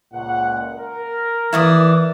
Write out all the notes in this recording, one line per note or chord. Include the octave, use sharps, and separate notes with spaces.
C#2 A#2 F#5
A#4
E3 E4 D5 D#6